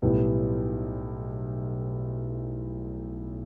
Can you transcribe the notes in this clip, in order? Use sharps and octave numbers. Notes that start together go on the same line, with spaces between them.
B1 A2 G3 B3